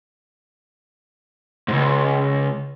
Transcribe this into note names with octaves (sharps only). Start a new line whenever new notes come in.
C#2 G#2